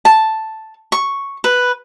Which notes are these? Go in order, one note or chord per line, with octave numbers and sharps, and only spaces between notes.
A5
C#6
B4